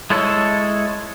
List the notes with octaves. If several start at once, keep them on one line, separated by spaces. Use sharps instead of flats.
G#3 E4 A4 C#5